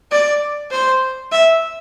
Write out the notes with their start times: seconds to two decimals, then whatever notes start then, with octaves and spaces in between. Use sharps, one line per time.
0.11 D5
0.71 C5
1.32 E5